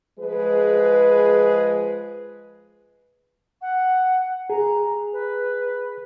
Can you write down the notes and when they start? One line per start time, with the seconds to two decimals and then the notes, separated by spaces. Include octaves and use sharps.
0.19 F3 G#3 G#4 B4
3.62 F#5
4.50 G#4 A#5
5.13 B4